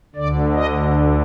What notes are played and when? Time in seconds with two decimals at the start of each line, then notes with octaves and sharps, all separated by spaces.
0.15 D2 D3 D5
0.55 D#5